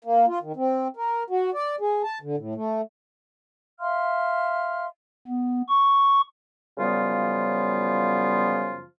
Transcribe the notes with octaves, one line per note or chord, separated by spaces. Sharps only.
A#3
F4
D#3
C4
A#4
F#4
D5
G#4
A5
D3
A2
A3
E5 F5 C6 F6
B3
C#6
F#2 C#3 F3 G3 B3 F4